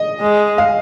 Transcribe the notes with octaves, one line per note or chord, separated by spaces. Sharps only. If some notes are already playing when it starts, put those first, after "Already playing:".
Already playing: D#5
G#3
F5